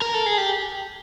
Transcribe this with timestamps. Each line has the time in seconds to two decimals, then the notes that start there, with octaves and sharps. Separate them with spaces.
0.02 A#4
0.14 A4
0.26 G#4
0.38 G4